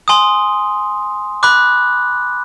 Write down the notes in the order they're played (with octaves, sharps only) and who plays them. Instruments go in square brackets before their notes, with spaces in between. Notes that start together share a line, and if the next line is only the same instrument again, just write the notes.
[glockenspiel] G#5 C6 D#6
B5 D6 F#6